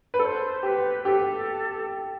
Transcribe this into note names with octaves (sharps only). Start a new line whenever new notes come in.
B4
A4 D5
C5
G4 B4 C5
G4 A4